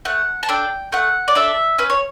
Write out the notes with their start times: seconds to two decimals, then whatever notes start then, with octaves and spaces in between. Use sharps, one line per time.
0.05 A3 F#5
0.43 A5
0.49 D4 A4 G5
0.92 A3 F#5
1.28 D5
1.35 D4 A4 E5
1.78 C#4 B4
1.90 C#5